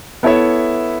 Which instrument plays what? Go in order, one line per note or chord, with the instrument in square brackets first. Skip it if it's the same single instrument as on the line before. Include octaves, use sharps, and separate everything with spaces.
[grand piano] B3 E4 A4 C#5 E5